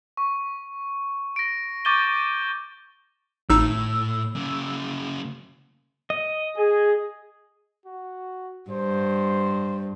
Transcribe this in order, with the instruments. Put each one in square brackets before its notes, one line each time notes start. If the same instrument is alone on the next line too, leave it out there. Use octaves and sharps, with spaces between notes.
[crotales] C#6
A#6 D7
C#6 D6 G6 A6 D#7 G7
[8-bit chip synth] G#1 D#4 [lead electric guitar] A2 [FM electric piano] E6
[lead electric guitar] C#3 A#3
[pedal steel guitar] D#5
[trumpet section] G#4
[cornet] F#4
[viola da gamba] G2 [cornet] C5